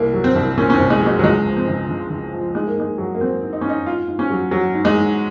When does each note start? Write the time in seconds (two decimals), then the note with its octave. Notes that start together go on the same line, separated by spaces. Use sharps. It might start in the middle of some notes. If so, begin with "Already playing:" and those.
Already playing: C2 A#3
0.14 F#3
0.24 C4
0.35 C2
0.57 A#2 C#4
0.70 C#4
0.73 C4
0.79 C2
0.90 G#3
1.02 F#3 G#3
1.19 F#3
1.24 C#2 G#3
1.46 F3
1.57 C4
1.68 C#2
1.89 C#3
2.10 C#2
2.33 F3
2.55 G#2 G#3
2.67 A#3
2.77 G#2 G#3
2.98 F#3
3.14 A#3
3.20 F#3 C4
3.43 G#2
3.53 D#4
3.61 G#2 C#4
3.69 D#4
3.86 G#2 F4
4.09 G#2
4.19 C#4
4.31 F#3
4.51 F#3
4.74 G#2
4.85 G#3
4.95 G#2